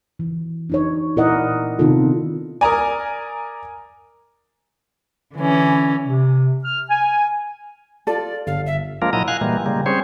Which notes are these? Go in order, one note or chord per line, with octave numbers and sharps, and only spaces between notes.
E3
D4 D#4 C#5
A#2 E4 A#4 D5 D#5 F#5
C3 D#3 B3 D#4 F4 A4
A#4 D5 G#5 A#5 D#6
D3 E3 C#4
C3
F6
G#5
F4 A4 D5
G1 F5
E5
F3 G#3 A#3 D4 F4 A#4
A#2 F#3 E4 D#5 A#5
F5 G#5 F#6
A#2 E3 G3 G#3 A#3
C#3 G3 G#3 A#3
G3 C4 C#4 G#4 C5 C#5